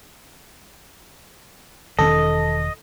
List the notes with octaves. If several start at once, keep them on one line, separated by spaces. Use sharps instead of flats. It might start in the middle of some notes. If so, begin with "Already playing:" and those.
E1 D#3 C#4 A4 D#5